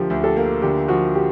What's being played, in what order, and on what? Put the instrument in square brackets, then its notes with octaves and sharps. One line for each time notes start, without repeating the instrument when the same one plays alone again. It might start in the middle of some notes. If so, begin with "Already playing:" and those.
Already playing: [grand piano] D2 D3 F3 A#3 [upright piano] G4
[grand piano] D2
[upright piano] G4 A4
[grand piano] A#3
[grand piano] D3 [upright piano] G4
[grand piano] F3 [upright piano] F#4
[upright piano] G4